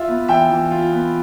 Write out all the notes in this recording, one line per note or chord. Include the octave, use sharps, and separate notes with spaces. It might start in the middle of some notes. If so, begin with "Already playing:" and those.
Already playing: F4 E5
B3
E3 E5 G5
E3
F4
B3